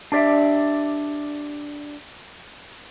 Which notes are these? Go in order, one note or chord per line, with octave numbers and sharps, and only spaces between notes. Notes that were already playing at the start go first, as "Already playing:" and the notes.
D4 G4 D5 E5